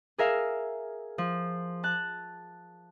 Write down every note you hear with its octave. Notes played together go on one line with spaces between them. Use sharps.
G#4 A#4 E5 F5
F3
A5 F#6